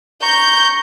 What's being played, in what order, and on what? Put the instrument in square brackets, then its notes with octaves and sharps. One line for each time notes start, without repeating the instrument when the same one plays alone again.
[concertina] A#5 C#6 [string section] G6